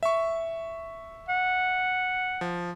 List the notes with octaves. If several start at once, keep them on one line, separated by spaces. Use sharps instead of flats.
E5 C#6
F#5
F3